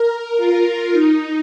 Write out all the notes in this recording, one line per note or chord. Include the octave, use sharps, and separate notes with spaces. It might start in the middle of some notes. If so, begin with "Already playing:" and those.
Already playing: A#4
F4
D#4